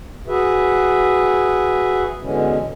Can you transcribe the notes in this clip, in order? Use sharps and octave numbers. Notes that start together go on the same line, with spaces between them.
F#4 G#4 B4 E5
B2 D3 E3 G#3 C#4